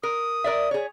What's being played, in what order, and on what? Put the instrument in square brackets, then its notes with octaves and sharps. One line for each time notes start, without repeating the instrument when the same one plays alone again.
[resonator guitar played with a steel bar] A#4 [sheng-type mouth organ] D#6
[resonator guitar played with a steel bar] A#4 D5 E5
G#4 C#5